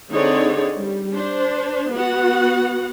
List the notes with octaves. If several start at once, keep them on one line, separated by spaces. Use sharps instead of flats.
D3 C4 D#4 G#4 C#5 D5
G3
D4 C5
B3 F#4 F#5